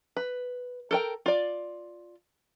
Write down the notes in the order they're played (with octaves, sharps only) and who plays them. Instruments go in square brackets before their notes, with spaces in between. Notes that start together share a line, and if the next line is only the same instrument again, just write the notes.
[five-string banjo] B4
A4 A#4 G5
F4 D5